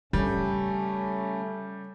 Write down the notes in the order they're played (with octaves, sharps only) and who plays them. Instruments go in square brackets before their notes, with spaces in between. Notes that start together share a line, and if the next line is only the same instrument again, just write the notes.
[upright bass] C#3 [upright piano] G3 [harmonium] A3 C#4